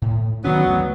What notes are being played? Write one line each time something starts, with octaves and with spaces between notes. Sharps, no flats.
A2
D#3 F#3 B3 C#4
C#2 F#2 A3